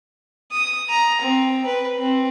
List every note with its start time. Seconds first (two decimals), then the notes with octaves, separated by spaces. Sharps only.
0.52 D#6
0.90 A#5
1.22 C4
1.66 B4
1.99 C4